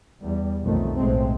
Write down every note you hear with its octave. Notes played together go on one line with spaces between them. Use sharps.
E2 G3
B1 F2 D#3 A3
B1 A2 G#3 A3 C4